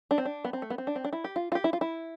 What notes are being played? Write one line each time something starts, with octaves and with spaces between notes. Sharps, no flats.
D4
C4
D4
B3
C4
A3
B3
C4
D4
C4
D4
E4
G4
F4
F4
G4
E4
F4
E4